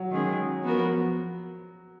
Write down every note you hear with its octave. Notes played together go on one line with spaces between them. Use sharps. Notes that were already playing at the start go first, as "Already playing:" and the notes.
Already playing: F#3
D#3 G#3 C#4 G#4
F3 B3 F#4 A#4